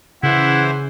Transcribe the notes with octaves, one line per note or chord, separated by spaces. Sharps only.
C#3 E3 E4 C5 F#5